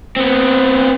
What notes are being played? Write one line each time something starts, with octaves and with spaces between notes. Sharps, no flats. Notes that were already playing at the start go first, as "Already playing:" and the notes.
B3 C4